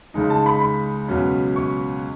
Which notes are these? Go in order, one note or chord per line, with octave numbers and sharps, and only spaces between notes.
C#2 C#3 G#3 D#4
A5
B5
B5
C#2 B2 F#3 C#4
C#6